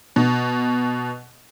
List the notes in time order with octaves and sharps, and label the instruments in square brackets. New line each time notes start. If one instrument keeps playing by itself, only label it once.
[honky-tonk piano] B2